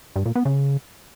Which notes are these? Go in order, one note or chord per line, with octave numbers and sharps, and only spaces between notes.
G2
A#2
B3
C#3